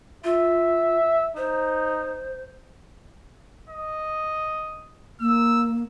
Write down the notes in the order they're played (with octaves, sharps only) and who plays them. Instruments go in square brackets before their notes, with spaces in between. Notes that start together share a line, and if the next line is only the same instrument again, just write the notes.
[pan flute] F4 [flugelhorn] E5
[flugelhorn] D#4 [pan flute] C5
[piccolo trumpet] D#5
[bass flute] A#3 [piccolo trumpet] E6